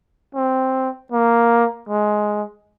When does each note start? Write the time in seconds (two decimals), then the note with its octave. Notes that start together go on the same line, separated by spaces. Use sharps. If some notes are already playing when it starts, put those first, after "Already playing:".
0.35 C4
1.12 A#3
1.89 G#3